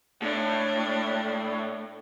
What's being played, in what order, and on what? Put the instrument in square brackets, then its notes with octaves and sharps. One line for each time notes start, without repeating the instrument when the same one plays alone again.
[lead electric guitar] A2 [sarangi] D4